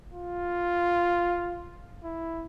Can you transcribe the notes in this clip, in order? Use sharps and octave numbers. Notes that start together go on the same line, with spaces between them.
F4
E4